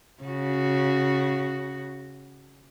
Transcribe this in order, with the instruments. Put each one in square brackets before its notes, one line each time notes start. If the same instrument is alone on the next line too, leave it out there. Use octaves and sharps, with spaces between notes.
[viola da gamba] C#3 F#4